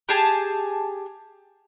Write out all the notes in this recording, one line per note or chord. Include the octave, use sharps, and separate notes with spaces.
G4 G#4 A5